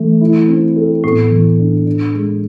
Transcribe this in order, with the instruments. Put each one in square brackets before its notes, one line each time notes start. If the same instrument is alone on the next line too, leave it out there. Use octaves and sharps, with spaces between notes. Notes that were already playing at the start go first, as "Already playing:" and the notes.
Already playing: [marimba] E3 [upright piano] A3
[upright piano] E4
C4
A4
[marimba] A2 [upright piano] B3
[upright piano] E3
D4
D4
G#3